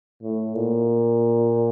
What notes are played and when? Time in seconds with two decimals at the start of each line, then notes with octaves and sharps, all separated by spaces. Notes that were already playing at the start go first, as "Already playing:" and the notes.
0.23 A2
0.54 A#2